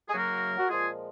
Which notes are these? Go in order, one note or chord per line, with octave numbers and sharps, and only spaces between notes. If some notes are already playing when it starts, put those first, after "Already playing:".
G#4
F#2 C#3 F#3 A#3 F#4 A#4
F#4
A#2 F3 G#3 F4 G#4